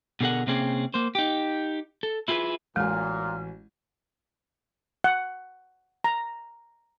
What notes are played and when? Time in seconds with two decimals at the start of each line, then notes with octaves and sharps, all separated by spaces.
0.21 B2 D3 G#4 A#4 F#5
0.47 C3 A#3 C4 C#4 G#4
0.94 A#3 C5
1.15 D#4 G4
2.03 A4
2.28 E4 F4 G#4 A4 B4
2.76 A1 A#2 G#3 F#4 G#5 F6
5.04 F#5
6.04 A#5